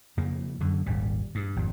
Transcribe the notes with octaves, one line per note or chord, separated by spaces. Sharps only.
F2 C#3 A#3
F#2 D3
D#1 G#1 G3
G2
G#1 F2